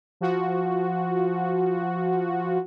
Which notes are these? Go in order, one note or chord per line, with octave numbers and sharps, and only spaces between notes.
F3 F#4